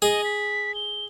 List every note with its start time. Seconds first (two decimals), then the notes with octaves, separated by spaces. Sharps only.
0.02 G#4 D#5
0.24 B6
0.75 G7